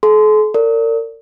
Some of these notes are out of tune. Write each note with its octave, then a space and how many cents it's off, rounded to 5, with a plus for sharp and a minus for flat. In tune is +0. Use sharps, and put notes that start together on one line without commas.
A4 -45 C6 -20
A#4 -40 D5 -25